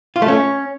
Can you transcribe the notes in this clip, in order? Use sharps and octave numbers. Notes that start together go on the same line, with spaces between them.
F4
A3
C#4